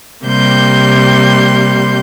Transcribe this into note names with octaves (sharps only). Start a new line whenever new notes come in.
C3 G3 A#3 C6 G6